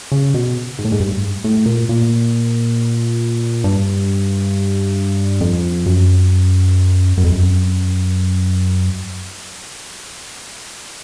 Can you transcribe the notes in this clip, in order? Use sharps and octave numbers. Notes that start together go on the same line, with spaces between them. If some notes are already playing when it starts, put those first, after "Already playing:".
C#3
B2
G#2
A2
G#2
G2
A2
A#2
A#2
G2
F2
F#2
F#2
F2
F#2